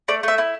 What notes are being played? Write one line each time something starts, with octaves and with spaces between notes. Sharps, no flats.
A3 D5
A3 E5
E4